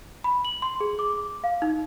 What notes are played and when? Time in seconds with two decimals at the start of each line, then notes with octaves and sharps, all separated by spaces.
0.24 B5
0.45 F#7
0.62 C6
0.80 G#4
0.99 D6
1.44 F5
1.62 D#4